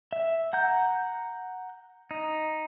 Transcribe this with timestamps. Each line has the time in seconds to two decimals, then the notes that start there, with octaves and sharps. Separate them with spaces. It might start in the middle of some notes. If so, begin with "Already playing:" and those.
0.13 E5
0.53 F#5 A#5 G6
2.11 D#4